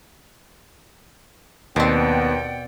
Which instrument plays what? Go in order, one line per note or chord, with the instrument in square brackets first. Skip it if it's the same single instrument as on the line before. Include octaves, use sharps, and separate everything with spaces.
[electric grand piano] D#2 [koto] B2 C4 [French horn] B3 [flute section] D5 F#5 G5